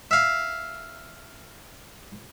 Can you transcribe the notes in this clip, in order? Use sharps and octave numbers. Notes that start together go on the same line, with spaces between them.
E5 F5